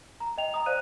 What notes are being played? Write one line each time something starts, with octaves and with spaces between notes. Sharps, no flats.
A#5
D#5 G5 F7
A#5 D#6
C5 D5 F5 F#6 D#7